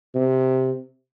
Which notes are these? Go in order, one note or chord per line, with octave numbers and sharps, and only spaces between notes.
C3